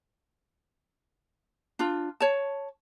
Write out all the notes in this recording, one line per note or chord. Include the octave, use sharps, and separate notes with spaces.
D4 F4
C#5 A5